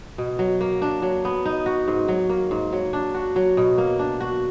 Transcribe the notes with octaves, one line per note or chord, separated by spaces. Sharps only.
B2
F#3
A#3
D4
F#3
B3
D#4
F#4
G#2
F#3
A#3
G#2
F#3
D4
F#4
F#3
B2
A#3
D4
F#4